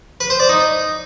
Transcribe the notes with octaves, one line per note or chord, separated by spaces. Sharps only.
B4
C5
D5
D#4